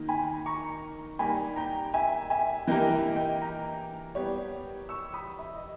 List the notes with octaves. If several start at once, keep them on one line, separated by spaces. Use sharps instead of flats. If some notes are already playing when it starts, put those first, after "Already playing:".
Already playing: D#3 A#3 D#4
G#5 B5
A#5 C#6
G3 A#3 D#4 G#5 B5
G5 A#5
E5 G#5
E5 G#5
E3 A#3 E4 G4 A#4 D#5 G5
E5
D#5 G5
G5 A#5
G3 B3 G4 C#5
C#6 E6
B5 D#6
E5
D#5